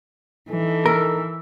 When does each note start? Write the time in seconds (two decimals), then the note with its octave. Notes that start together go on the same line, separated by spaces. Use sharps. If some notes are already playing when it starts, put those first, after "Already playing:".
0.49 E3 D4 D#4 A4
0.86 A#4 E6